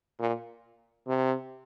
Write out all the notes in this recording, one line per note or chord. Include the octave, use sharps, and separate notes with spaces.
A#2
C3